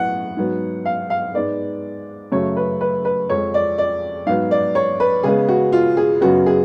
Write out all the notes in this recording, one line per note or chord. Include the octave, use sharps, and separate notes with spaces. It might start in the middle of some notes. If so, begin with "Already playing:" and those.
Already playing: A2 F#3 B3 F#5
G#2 F#3 B3
F5
F5
G#2 G#3 B3 D5
F#2 C#3 F#3 A3 C#5
B4
B4
B4
F2 F3 G#3 C#5
D5
D5
G#2 F#3 B3 F5
D5
C#5
B4
C#3 G#3 B3 G#4
F#4
F4
G#4
F#2 C#3 F#3 B3 F#4
G#4